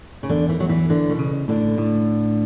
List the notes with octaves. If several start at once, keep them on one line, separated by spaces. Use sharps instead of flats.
C#3
E2 D3
E3
E2 F#3
E3
D3 E3
B2
C#3
A2 D3
A2